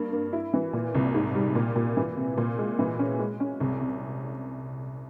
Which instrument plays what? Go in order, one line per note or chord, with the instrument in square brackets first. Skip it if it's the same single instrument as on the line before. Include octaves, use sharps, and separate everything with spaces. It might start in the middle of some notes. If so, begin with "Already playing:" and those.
Already playing: [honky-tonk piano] G2 A#3
A#3
E4
E3
A#2
C2
G#2
G3
A#2
A#2
E3
C3
A#2
G#3
E3
C#4
G#3
C#4
C2
C3